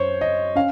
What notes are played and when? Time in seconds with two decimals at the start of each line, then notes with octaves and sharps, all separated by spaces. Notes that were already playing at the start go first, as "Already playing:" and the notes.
Already playing: F#2 C5 C#5
0.21 D#5
0.55 C#4 F5